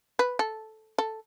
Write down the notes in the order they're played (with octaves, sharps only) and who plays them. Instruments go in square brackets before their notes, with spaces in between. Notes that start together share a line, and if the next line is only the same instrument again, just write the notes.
[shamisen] B4
A4
A4